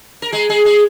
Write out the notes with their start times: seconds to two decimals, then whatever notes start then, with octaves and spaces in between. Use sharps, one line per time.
0.22 A#4
0.32 G#3 G#4
0.49 G#3 G#4
0.65 G#3 G#4